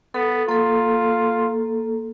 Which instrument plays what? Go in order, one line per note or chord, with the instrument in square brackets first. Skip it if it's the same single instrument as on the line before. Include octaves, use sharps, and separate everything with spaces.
[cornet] B3 [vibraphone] A4
[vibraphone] A#3 A4 [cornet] F4